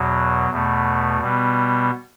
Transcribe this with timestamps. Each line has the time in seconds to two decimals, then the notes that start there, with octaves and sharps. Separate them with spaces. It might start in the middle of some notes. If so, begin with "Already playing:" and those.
Already playing: E2 B2 F#3
0.50 E2 B2 A3
1.20 B2 G3 B3